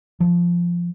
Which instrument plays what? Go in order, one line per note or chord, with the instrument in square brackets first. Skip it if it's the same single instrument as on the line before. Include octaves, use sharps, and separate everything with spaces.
[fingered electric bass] F3